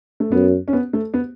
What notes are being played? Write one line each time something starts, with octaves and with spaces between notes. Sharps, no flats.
A3
F#2 B3
C#4
B3
A3
B3